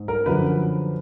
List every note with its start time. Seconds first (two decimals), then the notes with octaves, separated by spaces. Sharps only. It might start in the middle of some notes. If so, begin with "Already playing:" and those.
Already playing: G#2
0.08 A#4
0.26 F#2 D3 F3 B4